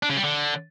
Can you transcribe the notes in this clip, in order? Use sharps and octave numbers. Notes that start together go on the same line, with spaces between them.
D4
C#3
G3
D3